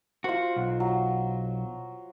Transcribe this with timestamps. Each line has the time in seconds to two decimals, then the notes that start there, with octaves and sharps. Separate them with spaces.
0.24 F4 F#4 C5
0.56 B1
0.80 F#3